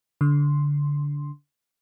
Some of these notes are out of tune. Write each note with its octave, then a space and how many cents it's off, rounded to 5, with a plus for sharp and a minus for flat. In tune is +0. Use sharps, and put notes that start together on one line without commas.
D3 -20 C6 +0